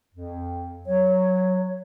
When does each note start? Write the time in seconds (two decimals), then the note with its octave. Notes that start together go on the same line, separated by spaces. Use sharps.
0.15 F2
0.87 F#3 C#5